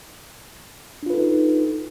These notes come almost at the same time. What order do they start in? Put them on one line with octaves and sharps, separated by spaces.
D4 F4 B4 A4 D#4